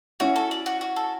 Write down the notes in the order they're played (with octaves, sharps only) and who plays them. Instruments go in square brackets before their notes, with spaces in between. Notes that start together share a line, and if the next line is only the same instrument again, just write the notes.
[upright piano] C#4 E4 [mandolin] F#4
[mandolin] A4
D5
F#4
F#4
A4